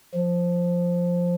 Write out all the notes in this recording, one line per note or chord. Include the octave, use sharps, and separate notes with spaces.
F3